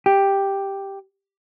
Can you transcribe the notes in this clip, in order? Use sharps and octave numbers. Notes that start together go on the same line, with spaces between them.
G4